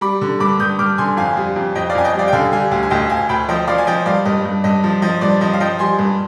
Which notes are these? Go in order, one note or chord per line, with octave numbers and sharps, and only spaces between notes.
G3 B5 D6
D3
G2 B5 D6
G2 D#6 G6
G2 D6 F6
D3 G#5 C6
F2 F5 G#5
G3
F2
F2 D#5 G5
D5 F5
F2 G#5
D#5 G5
G3 D5 F5
G5
D3 F5 G#5
G3 F5 G#5
D2 F5 G#5
G#5
D2 D#5 G5
D2 F5 G#5
D2 G5 B5
F3 D#5 G5
F3 D5 F5
G#5
F3 D#5 G5
G2 D5 F5
G2 D#5
G2
G2 D#5
F3
F3 D#5
G2 D5
F3 D#5
F5
F3 D#5 G5
G3 G#5 C6
G2